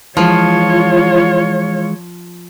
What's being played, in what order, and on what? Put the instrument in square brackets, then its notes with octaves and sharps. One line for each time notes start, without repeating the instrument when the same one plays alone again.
[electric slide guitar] E3 G#3 [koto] F3 [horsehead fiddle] F4 C#5